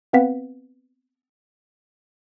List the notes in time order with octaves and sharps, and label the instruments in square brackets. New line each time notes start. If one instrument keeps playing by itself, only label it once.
[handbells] B3 C4 B4 F5 F#5 B6